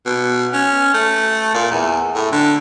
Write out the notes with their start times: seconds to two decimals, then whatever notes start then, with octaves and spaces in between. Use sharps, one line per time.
0.06 B2
0.53 C#4
0.94 A3
1.54 A#2
1.71 E2
2.15 A2
2.32 D3